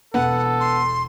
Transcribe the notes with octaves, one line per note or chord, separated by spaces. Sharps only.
E1 B3 A4 F#5
C6